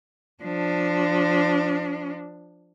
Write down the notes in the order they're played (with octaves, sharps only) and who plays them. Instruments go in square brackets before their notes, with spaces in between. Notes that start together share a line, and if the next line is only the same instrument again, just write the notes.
[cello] F3 D4